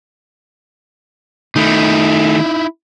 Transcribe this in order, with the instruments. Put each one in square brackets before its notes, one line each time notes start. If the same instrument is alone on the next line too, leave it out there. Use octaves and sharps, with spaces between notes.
[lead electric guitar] D#3 A3 [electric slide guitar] D#4 E4